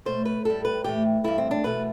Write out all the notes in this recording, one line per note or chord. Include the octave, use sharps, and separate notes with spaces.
B2 A3 C5
B4
A2 G3 A4
B4
A2 E3 A3 G4
G2 E3 A3 E4
C4
D4
E2 B2 A3 B4